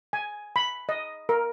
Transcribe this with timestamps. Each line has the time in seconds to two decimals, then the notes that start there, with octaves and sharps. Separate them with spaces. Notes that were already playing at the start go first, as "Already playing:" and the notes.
0.13 G#5
0.56 B5
0.89 D#5
1.29 A#4